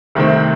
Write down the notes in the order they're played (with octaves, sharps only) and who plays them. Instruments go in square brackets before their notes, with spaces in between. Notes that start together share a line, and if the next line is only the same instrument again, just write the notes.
[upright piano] C2 C3 D#3 A3 C4